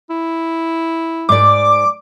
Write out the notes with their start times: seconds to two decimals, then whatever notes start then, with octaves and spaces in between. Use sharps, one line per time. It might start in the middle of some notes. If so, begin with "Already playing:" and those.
0.10 E4
1.29 G#2 D5 D6